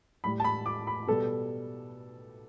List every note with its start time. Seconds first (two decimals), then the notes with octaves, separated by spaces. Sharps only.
0.24 A2 G3 B5
0.40 A5
0.44 B5
0.66 D6
0.87 B5
1.07 B2 G3 A4